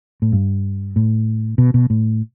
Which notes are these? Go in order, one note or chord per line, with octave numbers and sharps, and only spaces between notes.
A2
G2
A2
B2
B2
A2